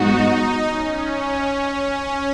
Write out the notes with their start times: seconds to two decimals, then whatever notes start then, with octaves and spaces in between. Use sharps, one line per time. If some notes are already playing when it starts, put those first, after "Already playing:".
Already playing: G#2 F#3 B3 D#4 F#4
0.66 C#4